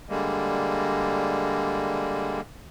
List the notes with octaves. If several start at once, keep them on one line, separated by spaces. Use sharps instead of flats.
D3 G3 G#3 A#3